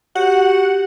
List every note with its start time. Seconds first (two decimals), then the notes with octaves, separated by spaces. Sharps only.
0.15 F#4 G4 F#5